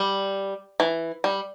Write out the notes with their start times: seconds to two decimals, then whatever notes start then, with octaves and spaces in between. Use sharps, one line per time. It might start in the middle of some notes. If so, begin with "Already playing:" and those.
Already playing: G3
0.80 E3
1.24 G3